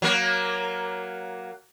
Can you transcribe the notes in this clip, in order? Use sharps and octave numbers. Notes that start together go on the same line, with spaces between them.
F#3 A#3